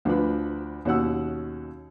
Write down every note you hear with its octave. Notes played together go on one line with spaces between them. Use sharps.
D2 F3 D4 B4 B5
D#2 B2 C#4 F#5 E6